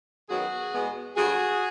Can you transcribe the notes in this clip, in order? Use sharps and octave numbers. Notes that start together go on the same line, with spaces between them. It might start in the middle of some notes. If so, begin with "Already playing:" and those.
F#2 D#3 F#3 B3 F#4 G#4
E2 B2 G#3 B3
G2 D3 F#3 F#4 G#4